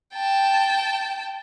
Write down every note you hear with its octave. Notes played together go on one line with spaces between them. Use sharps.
G5 A5